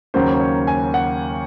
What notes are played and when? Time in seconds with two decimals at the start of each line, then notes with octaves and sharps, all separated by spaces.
0.14 D#2 C#3 F#3 A#3 C#4 C5
0.35 C5
0.41 C#5
0.67 G#5
0.94 F#5